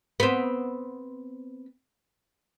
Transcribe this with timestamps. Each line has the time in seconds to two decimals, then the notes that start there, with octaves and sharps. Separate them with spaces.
0.20 B3 C4